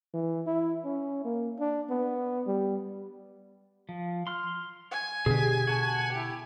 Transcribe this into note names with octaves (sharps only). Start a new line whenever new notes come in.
E3
E4
C#4
A#3
D4
B3
G3
F3
C6 F6
G#5
B2 D3 G4 G#4
F#4 A5
E4 G4